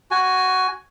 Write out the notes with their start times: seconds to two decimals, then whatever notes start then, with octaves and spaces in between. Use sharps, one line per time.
0.11 F#4 G#5